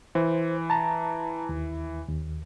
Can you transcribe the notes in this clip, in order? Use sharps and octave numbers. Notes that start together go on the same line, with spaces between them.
E3 C5
A5 A#5
D#2
D#2